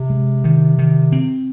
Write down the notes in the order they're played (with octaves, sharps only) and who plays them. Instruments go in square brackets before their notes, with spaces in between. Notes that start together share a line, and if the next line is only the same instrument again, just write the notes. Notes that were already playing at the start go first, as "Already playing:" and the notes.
Already playing: [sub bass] C3
[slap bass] G#3
D#3
D#3
C4